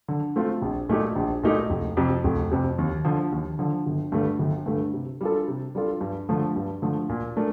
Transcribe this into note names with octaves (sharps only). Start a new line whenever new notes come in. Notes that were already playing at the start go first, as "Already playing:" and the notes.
D3
A3 C4 F4
A#1
A#2 A3 D#4 G4
A#1
A#2 A3 D#4 G4
F1
F2 C3
F1
F2 C3
D#2
D3 F3
D#2
D3 F3
G1
G2 D3 A3
G1
G2 D3 A3
C3
G3 D4 F4 A4
C3
G3 D4 F4 A4
G2
D3 F3 A3
G2
D3 F3 A3
A#2
A3 D4 A#4